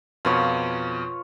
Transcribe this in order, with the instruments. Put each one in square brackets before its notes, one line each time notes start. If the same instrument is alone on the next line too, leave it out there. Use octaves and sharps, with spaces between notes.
[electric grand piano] F2 B2 [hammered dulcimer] F4 B4 C#5